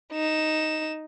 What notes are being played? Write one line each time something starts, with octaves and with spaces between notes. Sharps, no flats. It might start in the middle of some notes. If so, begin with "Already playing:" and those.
D#4 E7